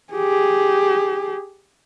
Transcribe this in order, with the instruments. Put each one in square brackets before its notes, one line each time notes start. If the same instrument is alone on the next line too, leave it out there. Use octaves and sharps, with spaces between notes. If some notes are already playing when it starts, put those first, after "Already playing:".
[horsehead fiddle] G4 G#4